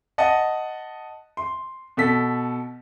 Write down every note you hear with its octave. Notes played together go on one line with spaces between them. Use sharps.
D#5 F#5 A5
C6
B2 A4 B6